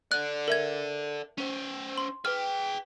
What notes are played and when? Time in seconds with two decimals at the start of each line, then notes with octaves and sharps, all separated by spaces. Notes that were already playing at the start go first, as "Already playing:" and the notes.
0.12 A4 D5 F#6
0.48 A#4 E5 G#6
1.38 C#4 C5
1.98 C6
2.25 G#4 B4 G5 F6